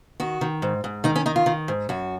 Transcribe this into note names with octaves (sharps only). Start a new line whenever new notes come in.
D#3 F#4
D#3
G#2
G#2
D#3 D#4
C#4
D#3 D#4
F4
D#3
G#2
F#2 F#4